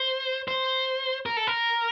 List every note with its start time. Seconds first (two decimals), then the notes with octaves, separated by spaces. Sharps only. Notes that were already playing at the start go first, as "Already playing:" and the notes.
Already playing: C5
0.48 C5
1.26 A#4
1.37 A4
1.47 A#4